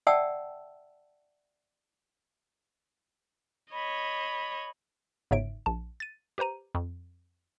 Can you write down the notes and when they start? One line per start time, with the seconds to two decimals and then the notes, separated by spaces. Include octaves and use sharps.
0.07 D5 E5 F#5 G5 A5 E6
3.72 C#5 D#5 B5
5.31 G1 G#2 C#3 C#5 E5 D7
5.66 A#1 A5
6.00 A6 D#7
6.38 G4 B4 C5 A#5 D#7
6.75 F2